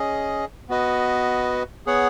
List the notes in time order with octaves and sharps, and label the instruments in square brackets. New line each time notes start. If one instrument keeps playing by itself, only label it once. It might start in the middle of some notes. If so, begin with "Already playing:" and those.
Already playing: [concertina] C#4 G#4 D#5
B3 F#4 B4 D#5
B3 G#4 C#5 F#5